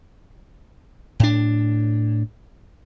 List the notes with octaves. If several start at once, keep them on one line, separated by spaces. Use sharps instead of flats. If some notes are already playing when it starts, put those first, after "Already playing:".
A2 D4